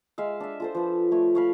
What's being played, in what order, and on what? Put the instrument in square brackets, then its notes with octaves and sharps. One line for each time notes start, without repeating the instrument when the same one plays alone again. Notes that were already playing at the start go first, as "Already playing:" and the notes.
[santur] G#3 E5 F5
D4 E5
F4 A4 C5
F3 B4
A3 C#5
C#5 F5 B5